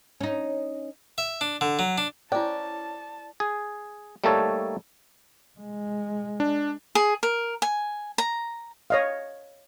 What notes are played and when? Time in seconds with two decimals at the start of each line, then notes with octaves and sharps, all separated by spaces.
0.21 C#4 D#4
1.18 E5
1.41 D4
1.61 D3
1.79 F#3
1.98 D4
2.32 C#4 E4 C5 D5 G5 A5
3.40 G#4
4.24 G3 A3 A#3 D#4 A4 C#5
5.59 G#3
6.40 D4
6.95 G#4
7.23 A#4
7.62 G#5
8.18 A#5
8.90 C#5 D#5 F5